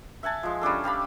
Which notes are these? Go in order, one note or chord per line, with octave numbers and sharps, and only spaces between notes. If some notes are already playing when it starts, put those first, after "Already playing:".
E5 F#5 G#5 A5
F3 G#3
G3 C#4 D4 A4
G4 F5 A5 B5